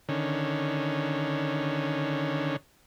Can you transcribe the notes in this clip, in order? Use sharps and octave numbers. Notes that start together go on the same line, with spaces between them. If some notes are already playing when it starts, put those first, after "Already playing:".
D3 D#3 C#4